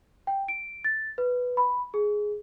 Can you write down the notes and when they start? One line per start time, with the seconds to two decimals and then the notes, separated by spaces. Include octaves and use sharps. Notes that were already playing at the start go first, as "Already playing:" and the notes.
0.27 G5
0.48 D7
0.84 A6
1.18 B4
1.57 B5
1.94 G#4